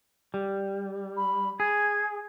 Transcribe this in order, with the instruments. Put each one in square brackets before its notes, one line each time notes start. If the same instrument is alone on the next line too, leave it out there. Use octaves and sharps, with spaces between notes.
[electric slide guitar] G3
[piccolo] B5
[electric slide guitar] G#4 [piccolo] G#6